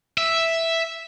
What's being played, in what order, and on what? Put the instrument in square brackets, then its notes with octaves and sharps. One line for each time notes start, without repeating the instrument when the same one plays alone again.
[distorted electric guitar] E5